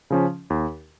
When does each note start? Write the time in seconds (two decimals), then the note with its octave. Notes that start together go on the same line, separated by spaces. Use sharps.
0.10 C#3 F3 C#4
0.50 D#2